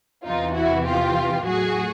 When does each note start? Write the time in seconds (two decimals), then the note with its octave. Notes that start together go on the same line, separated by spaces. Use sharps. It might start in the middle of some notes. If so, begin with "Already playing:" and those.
0.25 E2 C3 E3 D#4 F4
0.55 E4 F#4
0.86 F4 G4
1.46 A2 F#3 F#4 G#4